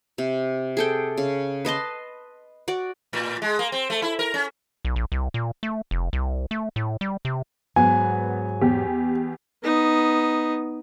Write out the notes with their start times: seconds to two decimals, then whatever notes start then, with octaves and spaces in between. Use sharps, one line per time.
0.18 C3
0.77 G#4 A4 G5
1.17 C#3
1.65 B4 D#5 A5 C6
2.68 F#4 D5
3.13 A2
3.42 G#3
3.59 A#3
3.72 C4
3.90 A3
4.02 E4
4.19 A#4
4.34 C#4
4.85 B1
4.96 A#1
5.12 C2
5.34 A#2
5.63 A3
5.91 F1
6.13 C2
6.51 A3
6.76 A2
7.01 G3
7.25 C3
7.76 G#2 F#3 B3 G#5
8.61 E2 G4
9.64 B3 D#4